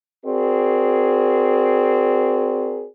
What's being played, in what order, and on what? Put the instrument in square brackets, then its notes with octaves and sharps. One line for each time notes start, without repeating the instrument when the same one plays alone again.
[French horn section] C4 F#4 G#4 A#4 D5